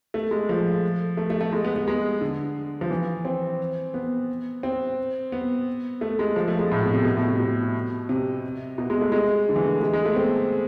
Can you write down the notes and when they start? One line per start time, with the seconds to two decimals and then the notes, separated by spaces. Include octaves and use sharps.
0.14 A3
0.31 G#3
0.49 F3
1.17 A3
1.30 A3
1.41 A3
1.52 G#3
1.65 B3
1.76 B3
1.88 G#3
2.21 D3
2.81 F3
2.91 E3
3.25 C4
3.94 B3
4.63 C4
5.32 B3
6.01 A3
6.19 G#3
6.36 F3
6.48 A3
6.59 G#3
6.71 A2
6.82 B2
6.93 C3
7.05 B2
7.17 A2
7.28 C3
7.40 B2
8.09 C3
8.78 B2
8.90 G#3
9.01 A3
9.12 G#3
9.49 D3
9.56 E3
9.65 A3
9.82 G#3
9.93 G#3
10.05 A3
10.12 B3
10.16 C4